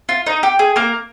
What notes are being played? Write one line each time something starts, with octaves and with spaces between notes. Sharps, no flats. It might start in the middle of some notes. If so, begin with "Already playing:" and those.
F4
D#4
G4
G#4
A#3 A#4